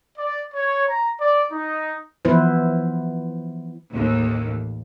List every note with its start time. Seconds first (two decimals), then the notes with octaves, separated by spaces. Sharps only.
0.18 D5
0.54 C#5
0.88 A#5
1.20 D5
1.51 D#4
2.25 E3 F3 B3 E4 B4 C5
3.91 A1 D#2